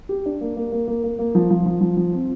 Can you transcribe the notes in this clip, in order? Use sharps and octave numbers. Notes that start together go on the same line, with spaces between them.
G4
D4
A#3
A#3
A#3
A#3
A#3
A#3
F3
F3
F3
F3
F3
C4